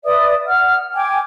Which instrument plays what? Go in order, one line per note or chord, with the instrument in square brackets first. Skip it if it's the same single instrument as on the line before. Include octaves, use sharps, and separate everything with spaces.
[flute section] B4 D5 E5 D#6
F#5 F6
G5 G#5 D6